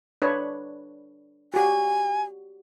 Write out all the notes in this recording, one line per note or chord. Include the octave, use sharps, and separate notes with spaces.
D4 B4 C#5
F#4 G4 G#5